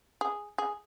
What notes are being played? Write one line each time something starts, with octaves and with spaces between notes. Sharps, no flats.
G#4
G#4